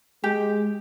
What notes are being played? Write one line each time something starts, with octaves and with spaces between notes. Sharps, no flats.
G#3 G4